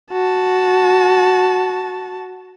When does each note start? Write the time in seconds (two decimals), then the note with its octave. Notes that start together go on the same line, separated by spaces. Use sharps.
0.12 F#4 A5